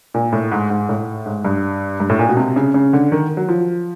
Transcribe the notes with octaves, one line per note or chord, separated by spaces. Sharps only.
A#2
A2
G#2
G#2
A2
G#2
G2
G2
A2
A#2
B2
C3
C#3
C#3
D3
D#3
F#3
F3